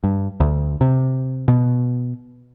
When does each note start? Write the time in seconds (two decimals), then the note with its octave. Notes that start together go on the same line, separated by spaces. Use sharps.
0.04 G2
0.40 D2
0.81 C3
1.48 B2